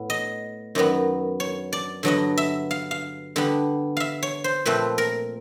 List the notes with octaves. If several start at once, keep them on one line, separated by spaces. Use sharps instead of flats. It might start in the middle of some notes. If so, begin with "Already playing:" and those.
Already playing: A2 B3
D#5
F#2 D#3 F#3 B3
C#5
D5
G2 D3 F#3 B3 D#5
E5
F5
F5
D3 G3 B3
E5 F5
C#5
C5
A#2 F3 A3 C4 B4
A#4